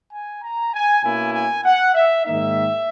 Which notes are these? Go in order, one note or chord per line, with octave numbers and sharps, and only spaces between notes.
G#5
A#5
G#5
B2 A#3 C#4 E4 G#5
G#5
F#5
E5
G#2 D#3 A#3 D#4 E5